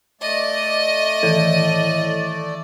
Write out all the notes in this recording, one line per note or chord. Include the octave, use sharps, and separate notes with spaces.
A3 D5 D#5
A2 D#3 E3